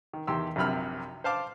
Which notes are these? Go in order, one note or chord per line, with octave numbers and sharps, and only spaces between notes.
D#3
E2 D#3 G4 C6 E6
A#1 F#2 C3 B5 F6
C5 F5 A5 D6